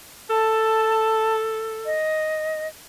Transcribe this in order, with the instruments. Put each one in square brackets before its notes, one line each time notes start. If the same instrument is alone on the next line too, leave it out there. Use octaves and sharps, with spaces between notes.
[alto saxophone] A4 [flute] A5
[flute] D#5